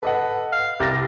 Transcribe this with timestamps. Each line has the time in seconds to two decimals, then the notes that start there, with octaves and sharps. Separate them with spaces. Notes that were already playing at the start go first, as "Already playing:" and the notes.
0.03 A4 B4 D#5 F#5
0.52 F5
0.80 C2 G4 A6 A#6